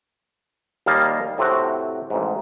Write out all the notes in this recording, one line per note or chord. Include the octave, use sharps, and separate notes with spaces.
D#2 G3 A#3 D#5 F5 A5
A2 C3 C4 F#4
A1 G#2